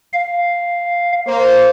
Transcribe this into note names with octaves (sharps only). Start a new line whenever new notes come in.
F5
A#3 C5